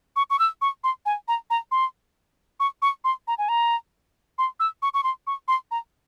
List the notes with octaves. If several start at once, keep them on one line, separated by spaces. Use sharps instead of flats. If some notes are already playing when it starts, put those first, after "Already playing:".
C#6
C#6
E6
C#6
C6
G#5
A#5
A#5
C6
C#6
C#6
C6
A#5
G#5
A#5
C6
E6
C#6
C#6
C6
C#6
C6
A#5